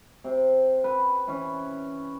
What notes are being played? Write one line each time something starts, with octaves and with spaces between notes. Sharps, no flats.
C3
B4
E3 C#4